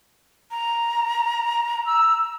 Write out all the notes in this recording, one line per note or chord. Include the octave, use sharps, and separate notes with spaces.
A#5
E6